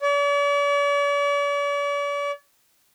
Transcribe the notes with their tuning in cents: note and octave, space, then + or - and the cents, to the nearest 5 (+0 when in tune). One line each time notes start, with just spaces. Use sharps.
D5 -45